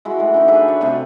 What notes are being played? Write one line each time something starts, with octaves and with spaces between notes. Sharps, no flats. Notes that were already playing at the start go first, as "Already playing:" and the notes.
G#3 E4 F#4
E3 A3
D3 D#4
D4 G#4 B4 E5
C#5 D5
C3 A3 D#5 F5